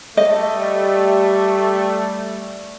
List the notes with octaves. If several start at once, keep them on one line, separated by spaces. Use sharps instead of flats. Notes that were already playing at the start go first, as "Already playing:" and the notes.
G3 A3 D#5